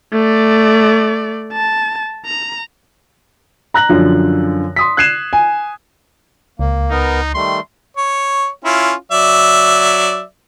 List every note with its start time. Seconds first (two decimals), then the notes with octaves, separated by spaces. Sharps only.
0.13 A3 D5
1.53 A5
2.26 A#5
3.74 A#5 F#6 A#6 F#7
3.89 F#2 D3 F3
4.76 C6 D#6 B6
4.97 F#6 G#6 C7 D#7 E7
5.33 G#5
6.59 C#2 A#3
6.91 B3 D#4 A#4
7.34 D#3 G3 A3 C6
7.97 C#5
8.65 C#4 E4 F4
9.12 F#3 D5 E5